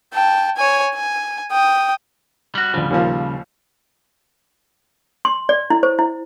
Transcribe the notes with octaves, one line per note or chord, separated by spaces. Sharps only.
G5 A5
C#5 G#5
G#5
G5 D#6
G3 F#4
D2 C#3 F3 G3
D#2 A#2 F3
C6
D5
E4
C5
E4